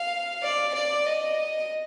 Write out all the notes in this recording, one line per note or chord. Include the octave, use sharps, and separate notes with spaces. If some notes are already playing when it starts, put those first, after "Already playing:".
Already playing: F5
D5
D5
D#5